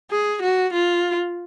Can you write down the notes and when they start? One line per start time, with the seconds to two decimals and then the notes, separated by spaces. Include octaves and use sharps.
0.11 G#4
0.42 F#4
0.73 F4